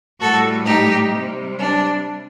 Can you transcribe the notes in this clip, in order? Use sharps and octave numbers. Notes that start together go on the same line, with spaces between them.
A2 G3 F#4 A4
D#4 G4
C3 G3
D4